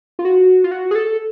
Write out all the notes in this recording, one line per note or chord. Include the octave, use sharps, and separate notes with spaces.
F4
F#4
F4
F#4
G#4
A4